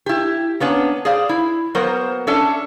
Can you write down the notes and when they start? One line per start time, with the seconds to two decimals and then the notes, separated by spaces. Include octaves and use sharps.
0.06 E4 G4
0.60 A#3 B3 C#4 D4
1.05 G#4 C5 D5 F5
1.29 E4
1.75 F#3 A#3 B3 A#4 C5
2.27 C#4 D4 A4 E5